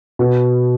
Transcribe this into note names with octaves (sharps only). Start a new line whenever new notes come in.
B2